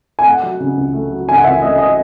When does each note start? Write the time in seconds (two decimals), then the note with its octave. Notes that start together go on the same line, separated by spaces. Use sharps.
0.19 G#5
0.25 A3 F#5
0.43 F#3
0.60 C#3
0.77 C#2
0.93 A3
1.11 F#3
1.27 C#3 G#5
1.36 F#5
1.44 C#2 E5
1.62 A3 D#5
1.78 F#3 D#5